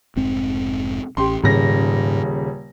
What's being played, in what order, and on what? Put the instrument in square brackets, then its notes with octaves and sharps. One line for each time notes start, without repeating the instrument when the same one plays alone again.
[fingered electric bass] F1 G#2 C4
[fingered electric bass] A1 C#4 [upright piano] G4 C6
[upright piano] D#1 C#3 A#6 [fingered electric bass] G#2